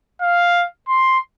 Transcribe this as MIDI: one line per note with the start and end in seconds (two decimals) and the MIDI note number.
0.21 0.66 77
0.88 1.18 84